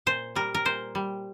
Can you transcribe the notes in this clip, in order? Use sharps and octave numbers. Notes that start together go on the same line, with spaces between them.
A#2 C5
G3 A#4
A#4
A#2 C5
G3